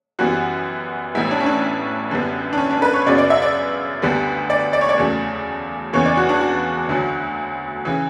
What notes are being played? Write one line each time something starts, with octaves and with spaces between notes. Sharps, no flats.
F#2 E3 G3 B3 F#4
A1 A2 G3 B3 E4
D4
C#4
D4
F#2 D3 G3 B3
D4
C#4
D4
B4
C#5
F#2 C#3 F#3 B3 D5
D5
E5
D5
D2 D3 G3 B3
D5
D5
C#5
D5
E2 C#3 F#3 A3
E2 C#3 E3 B3 C#5
D5
F#4
D4
F#4
D2 D3 F#3
C#3 E3